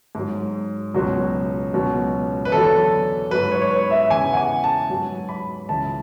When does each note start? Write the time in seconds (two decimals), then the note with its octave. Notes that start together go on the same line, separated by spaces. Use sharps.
0.15 G#2 F#3
0.94 C#2 B2 F#3
1.74 C#2 B2 F#3
2.45 B4
2.52 E2 D3 F#3 A4
3.31 G#2 F#3 B4
3.52 C#5
3.62 C#5
3.71 B4
3.90 E5
4.10 E2 C#3 E3 G#5
4.33 F#5
4.37 G#5
4.64 A5
4.89 G#2 F#3
5.29 B5
5.69 C#2 C#3 E3 A5